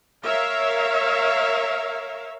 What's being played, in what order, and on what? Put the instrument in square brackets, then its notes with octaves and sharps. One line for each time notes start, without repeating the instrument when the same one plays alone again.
[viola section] A#4 C#5 E5 F5